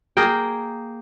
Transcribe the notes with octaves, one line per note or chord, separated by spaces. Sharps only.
A#3 G#4 A#4 G5